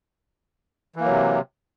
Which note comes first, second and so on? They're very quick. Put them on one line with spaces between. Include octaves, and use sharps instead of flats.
E3 A#3 F#3 C3